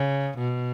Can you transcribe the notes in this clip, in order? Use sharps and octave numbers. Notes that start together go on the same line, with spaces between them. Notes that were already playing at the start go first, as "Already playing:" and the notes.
Already playing: C#3
B2